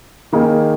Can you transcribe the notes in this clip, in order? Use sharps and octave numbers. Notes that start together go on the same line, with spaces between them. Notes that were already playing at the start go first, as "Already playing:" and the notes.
D#3 A#3 D#4 G#4